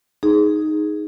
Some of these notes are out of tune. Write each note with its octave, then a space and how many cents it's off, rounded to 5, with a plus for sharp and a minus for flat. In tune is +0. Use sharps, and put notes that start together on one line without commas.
D#4 +0 G#4 +0